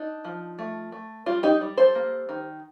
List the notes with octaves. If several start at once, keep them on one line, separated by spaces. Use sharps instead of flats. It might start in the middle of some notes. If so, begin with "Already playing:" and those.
Already playing: D4 D#4
F3
A3
A3
G3 F4
D#4 G4
G3
A4 C5
A#3
D#3